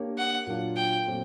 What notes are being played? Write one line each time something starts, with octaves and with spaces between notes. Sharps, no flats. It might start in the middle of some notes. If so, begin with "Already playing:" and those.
Already playing: A#3 D4 G4 A#4 C#5
F#5
A#2 F#3 A#3 D4 F4
G5
A#2 F#3 A3 C4